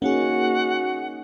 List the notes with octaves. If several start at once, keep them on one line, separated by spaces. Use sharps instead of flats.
A#3 C#4 D#4 F#4 G#4 F#5